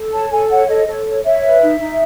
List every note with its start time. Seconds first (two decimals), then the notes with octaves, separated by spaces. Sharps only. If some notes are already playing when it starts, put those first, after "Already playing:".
Already playing: A4
0.12 C#5 A5
0.31 A4 G#5
0.49 C#5 F#5
0.69 A4 D#5
0.87 A4 C#5
1.06 C#5
1.25 C#5 E5
1.44 B4
1.62 D#4
1.80 D#4